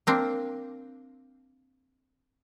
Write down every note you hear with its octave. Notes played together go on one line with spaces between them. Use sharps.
A#3 C4 D4